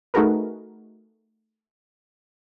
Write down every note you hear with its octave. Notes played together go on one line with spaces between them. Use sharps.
A3 D#4 F#4 G#4 A#4 B4